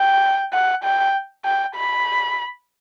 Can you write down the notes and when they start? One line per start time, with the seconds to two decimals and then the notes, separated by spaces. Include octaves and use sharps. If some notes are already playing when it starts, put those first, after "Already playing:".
Already playing: G5
0.53 F#5
0.84 G5
1.45 G5
1.76 B5